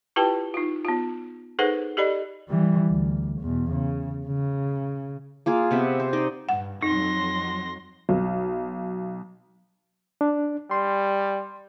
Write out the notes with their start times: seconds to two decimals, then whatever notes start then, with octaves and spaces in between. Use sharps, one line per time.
0.16 E4 F4 G4 B4 G5 A5
0.54 D#4 F4
0.85 B3 F4
1.59 D#4 G#4 A4 B4 C5 F#5
1.97 G4 A4 D5 D#5 B5
2.48 E3 G3
2.89 D2
3.41 E2 B2
3.71 C#3
4.26 C#3
5.46 A#3 F4 G#4
5.71 C3 B3 E5
5.99 C5
6.13 D#4 D5 D#5
6.49 G2 F#5
6.83 F2 F#3 D#4 C6 A#6
8.09 B1
10.21 D4
10.71 G3 C6